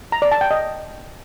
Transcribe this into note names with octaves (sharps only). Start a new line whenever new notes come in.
A#5
D5
A5
G5
D#5